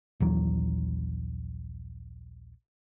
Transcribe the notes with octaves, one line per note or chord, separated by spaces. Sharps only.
A#1 D#2 E3 F#3